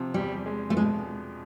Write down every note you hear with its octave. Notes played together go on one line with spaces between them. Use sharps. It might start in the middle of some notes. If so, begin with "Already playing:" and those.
Already playing: C3 F3
E2 G3
G#3
A3
B2 G#3